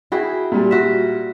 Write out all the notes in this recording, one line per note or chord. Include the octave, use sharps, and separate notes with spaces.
E4 F#4 G#4 G5
A#2 G3
F#4 E5